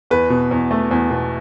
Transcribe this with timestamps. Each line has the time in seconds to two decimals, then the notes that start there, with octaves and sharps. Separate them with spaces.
0.11 E2 B4
0.30 B2
0.51 E2
0.71 A3
0.91 E2
1.11 B2